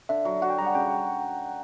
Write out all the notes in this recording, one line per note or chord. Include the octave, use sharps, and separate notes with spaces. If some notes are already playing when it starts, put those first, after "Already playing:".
D3 E5
F#3
F#4 F#5
G5
G3 A#5
F#5
C#3 G5